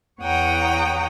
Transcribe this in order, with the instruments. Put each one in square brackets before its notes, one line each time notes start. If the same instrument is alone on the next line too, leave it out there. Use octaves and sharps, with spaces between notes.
[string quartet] E2 C#5 F#5 G5 A#5 D#6